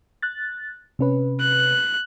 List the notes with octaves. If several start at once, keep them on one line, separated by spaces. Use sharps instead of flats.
F#6 A6
C3 C#4 B4
F#6